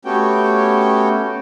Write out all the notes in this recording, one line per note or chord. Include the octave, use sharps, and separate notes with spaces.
A3 B3 C#4 F#4 G4 G5